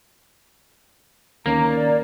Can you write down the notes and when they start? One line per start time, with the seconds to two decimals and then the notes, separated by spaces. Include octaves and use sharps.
1.46 D2 D#3 A#3 C#4 A#5
1.70 D5